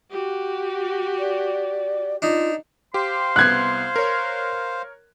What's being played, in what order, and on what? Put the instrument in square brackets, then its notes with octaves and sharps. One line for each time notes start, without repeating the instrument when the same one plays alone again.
[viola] F#4 G4
[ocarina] D5
[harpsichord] D4 D#4 [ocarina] F4
[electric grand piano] G4 [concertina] C5 F5 [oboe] C6
[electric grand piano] C2 B3 [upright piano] F#6 G#6
[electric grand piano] A#4 C#5